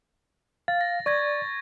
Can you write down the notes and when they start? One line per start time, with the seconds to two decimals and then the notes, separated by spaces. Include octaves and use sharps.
0.68 F5 A6
0.81 A#6
1.06 D5 C#6 G#6 A#6